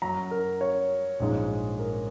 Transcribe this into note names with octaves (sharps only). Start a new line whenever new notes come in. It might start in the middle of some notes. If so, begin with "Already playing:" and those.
F#2 F#3 A#5
A#4
C#5
A#1 G#2 G#3
A#4